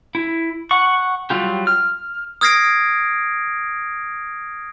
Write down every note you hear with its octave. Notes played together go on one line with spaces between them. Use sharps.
E4
F#5 C#6
F#3 G3 F4 G4
F6
D#6 F6 G#6 A#6 C7 D7